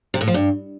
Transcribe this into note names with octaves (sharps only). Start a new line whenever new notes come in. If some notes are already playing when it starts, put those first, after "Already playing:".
C3
A2
F3
G2